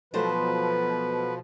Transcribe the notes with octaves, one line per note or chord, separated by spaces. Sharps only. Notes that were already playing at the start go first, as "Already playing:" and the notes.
B2 F3 F#3 A3 B4 C5